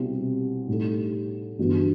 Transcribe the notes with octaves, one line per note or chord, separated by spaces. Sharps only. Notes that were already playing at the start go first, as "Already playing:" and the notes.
Already playing: C2 B2 G3 C4 E4
A2 G3 D#4 A4
G1 G2 E3 B3 F#4